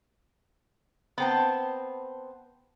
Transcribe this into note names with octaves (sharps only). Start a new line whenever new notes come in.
B3 C4 A5